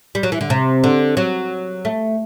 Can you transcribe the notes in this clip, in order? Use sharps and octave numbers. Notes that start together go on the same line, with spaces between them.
G3
F#3
E3
D3
C3
D3
F#3
A3